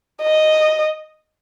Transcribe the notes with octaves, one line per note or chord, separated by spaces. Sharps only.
D#5